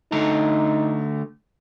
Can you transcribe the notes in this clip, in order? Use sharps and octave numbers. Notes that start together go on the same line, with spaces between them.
D3 A3 D#4 A#5